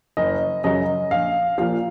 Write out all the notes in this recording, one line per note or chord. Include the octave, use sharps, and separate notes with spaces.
F#1 D#5
F#2 C#3 F#3 D#5
A#1 F5
A#2 F3 F5